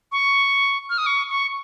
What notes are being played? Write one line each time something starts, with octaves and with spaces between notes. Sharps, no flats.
C#6
F6
D#6
C#6
C#6